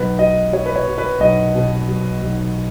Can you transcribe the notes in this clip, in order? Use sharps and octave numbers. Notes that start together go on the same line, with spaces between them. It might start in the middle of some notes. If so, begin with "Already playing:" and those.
Already playing: B1 B4
F#3 D#5
F#3 C#5
B4
C#5
B2
B4
B1 D#5
B2
F#3
B1